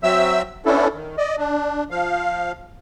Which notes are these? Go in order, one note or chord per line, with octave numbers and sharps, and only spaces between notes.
F#3 C4 E5 E6
B3 C#4 D4 E4 A4
D#3
D5 D#5
D4
F3 F5